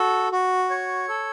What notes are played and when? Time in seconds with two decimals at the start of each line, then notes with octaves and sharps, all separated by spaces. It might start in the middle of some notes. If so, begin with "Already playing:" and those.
Already playing: F#4 A4
0.32 F#4
0.70 C#5
1.08 A4